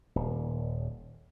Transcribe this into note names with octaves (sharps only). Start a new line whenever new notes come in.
D#1